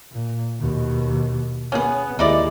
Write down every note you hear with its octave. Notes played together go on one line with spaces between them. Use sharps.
A#2
D#2 B2
B3 C#4 G#4
D#2 G#3 D#4 E4 D5